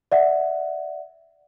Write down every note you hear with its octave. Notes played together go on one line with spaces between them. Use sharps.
D5 E5 F#5